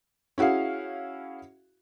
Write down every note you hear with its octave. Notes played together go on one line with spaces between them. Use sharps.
C#4 E4 F#4 G#4 F5